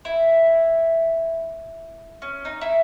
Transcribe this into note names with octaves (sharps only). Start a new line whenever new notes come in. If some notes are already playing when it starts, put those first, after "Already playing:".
E4
C#4
D#4
E4